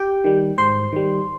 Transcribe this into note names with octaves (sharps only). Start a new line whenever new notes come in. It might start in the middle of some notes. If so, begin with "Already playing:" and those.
Already playing: G4 G5
D#3 G3
G#2 C5 C6
D#3 G3